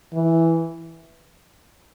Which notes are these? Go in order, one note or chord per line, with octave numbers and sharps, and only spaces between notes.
E3